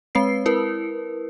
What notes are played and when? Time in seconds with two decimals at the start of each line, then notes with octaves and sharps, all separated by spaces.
0.15 G#3 C4 B4 C7
0.46 E4 A#4 B4